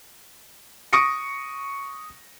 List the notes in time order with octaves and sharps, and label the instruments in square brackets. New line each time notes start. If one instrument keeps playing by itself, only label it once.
[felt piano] C#6 D#6 A#6 C#7 D7